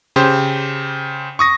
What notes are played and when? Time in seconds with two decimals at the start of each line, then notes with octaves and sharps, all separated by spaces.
0.16 C#3 G4 C5
1.39 C#6 D#6 A#6